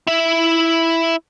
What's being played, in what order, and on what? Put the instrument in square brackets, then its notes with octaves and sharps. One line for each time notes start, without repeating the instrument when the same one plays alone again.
[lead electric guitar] E4 E5